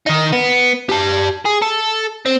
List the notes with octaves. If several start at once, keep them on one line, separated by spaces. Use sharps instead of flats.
D#3 D#4
B3
G4 A5
G#4
A4
C4